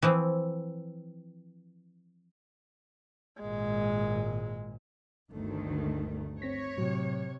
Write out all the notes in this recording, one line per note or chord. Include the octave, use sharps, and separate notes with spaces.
E3 F3 C4
G#1 A#2 G#3
G1 D2 D#3 A3
D3
C4 C#5 A#6 B6
A2 C3 F#3